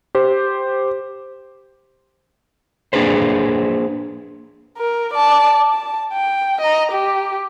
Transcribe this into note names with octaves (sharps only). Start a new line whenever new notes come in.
G4 C5
A#3 D4 G#4 B4 C5
A#4
D5 A5
A5
G5
D#5 A#5
G4